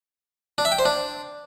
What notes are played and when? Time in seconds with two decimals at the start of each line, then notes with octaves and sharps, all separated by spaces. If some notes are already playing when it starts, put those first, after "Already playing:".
0.58 D4
0.65 E5
0.72 G5
0.79 C5
0.85 D4